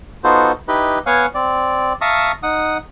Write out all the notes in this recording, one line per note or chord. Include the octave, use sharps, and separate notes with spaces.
B3 D#4 F4 F#4 A4 C5
D#4 E4 G4 B4 D#5
B3 C#5 F5 F#5 G#5
C4 D5
E5 F5 A5 A#5 C#6 D#6
D#4 F#5 D#6